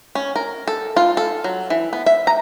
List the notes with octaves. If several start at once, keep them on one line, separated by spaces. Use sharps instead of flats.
C#4
A#4
A4
F4
A4
F#3
E3
B3
E5
A#5